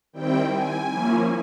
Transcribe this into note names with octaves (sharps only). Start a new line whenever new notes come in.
D#3 G3 C4 E4 G5
G#5
F3 A#3 C#4 E4